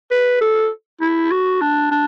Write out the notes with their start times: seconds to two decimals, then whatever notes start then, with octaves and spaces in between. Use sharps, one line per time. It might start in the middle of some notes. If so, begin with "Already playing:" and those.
0.11 B4
0.41 A4
1.01 E4
1.31 F#4
1.61 D4
1.91 D4